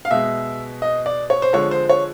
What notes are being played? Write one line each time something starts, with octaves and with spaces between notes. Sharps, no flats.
F5
B2 G#3 E5
D#5
D5
C#5
C5
D3 F3 G#3 C#5
C5
C#5